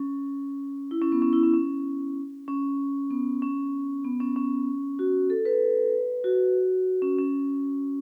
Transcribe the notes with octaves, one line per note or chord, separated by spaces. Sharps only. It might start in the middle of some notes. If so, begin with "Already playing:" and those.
Already playing: C#4
E4
C#4
B3
C#4
E4
C#4
C#4
C#4
B3
C#4
B3
C#4
C#4
F#4
A4
B4
F#4
C#4
C#4